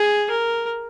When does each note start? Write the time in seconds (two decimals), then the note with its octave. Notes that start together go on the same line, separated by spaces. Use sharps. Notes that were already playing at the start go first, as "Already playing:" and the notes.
Already playing: G#4
0.31 A#4